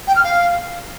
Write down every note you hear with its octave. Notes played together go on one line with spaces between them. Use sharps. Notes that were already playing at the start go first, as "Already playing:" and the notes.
G5
F6
F5